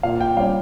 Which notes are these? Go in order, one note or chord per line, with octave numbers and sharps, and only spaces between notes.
A#2 F5
G5
G3 C#4 F5